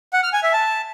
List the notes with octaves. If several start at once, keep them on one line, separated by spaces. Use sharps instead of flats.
F#5
F6
G#5
E5
A5